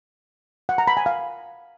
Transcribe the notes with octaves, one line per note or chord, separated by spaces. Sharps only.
F#5
A#5
B5
G#5
F5